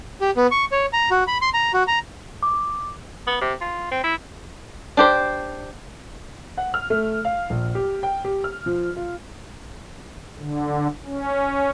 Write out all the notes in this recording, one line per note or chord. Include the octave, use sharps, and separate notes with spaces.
G4
B3
C#6
C#5
A#5
F#4
B5
C6
A#5
F#4
A#5
D6
B3
C3
F4
C4
E4
D4 G4 C5
F#5
F6
A3
F5
A#1
G4
G5
G4
F6
F3
F4
D3
C#4